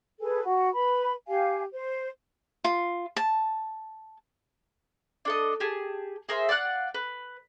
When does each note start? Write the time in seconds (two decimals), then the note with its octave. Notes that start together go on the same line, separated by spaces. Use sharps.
0.21 G#4 A4 B4 G#5
0.44 F#4
0.73 B4 B5
1.28 G4 F5 G#5
1.73 C5
2.64 F4
3.16 A5
5.25 D4 A4 D#5
5.60 G4 G#4 A5
6.29 G#4 A#4 C5 E5
6.49 D5 F5 F#5 F#6
6.94 B4